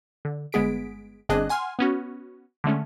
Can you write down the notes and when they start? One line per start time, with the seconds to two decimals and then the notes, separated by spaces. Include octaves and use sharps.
0.25 D3
0.52 G1 G#3 B3 G#4 B6 D7
1.29 G1 C4 D4 G#4 D#5 F#6
1.49 F#5 G#5 C6 F6
1.79 B3 C#4 F#4
2.64 D3 G#3 A3 C#4